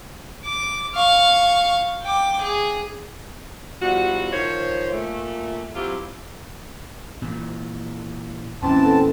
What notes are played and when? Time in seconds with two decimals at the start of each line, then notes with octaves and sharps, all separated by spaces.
0.45 D6
0.95 F5 C#6
2.02 G5 D6
2.41 G#4
3.81 E2 F3 G3 F#4
4.33 D#3 F3 C5 C#5
4.92 A#2 A3
5.75 F#3 C4 E4 F4 G4
7.22 A#2 E3
8.62 E2 A#2 E3 C4 C#4 A5 C6
8.81 A4 B4 F#5